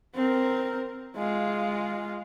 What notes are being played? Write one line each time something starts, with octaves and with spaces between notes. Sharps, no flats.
C4 A#4
G#3 F4